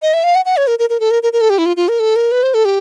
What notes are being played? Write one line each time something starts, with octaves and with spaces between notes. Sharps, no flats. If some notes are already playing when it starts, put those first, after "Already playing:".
D#5
E5
F5
F#5
F#5
C#5
A#4
A#4
A#4
A4
A#4
A#4
A#4
A4
G4
E4
F4
F4
A#4
A4
A#4
B4
C5
A4
G4